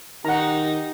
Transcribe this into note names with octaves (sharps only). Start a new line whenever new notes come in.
D#3 D#4 G4 F#5 A#5